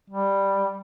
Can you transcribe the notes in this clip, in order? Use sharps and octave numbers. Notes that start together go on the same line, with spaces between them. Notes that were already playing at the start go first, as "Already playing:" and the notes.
G3